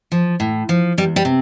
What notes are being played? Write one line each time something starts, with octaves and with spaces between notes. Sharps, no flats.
F3
A2
F3
E2 G3
G3
C3